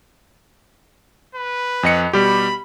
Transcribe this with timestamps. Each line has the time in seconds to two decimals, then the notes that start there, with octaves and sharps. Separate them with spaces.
1.35 B4
1.83 F2 D#5 C#7
2.13 B2 G3 G4 B5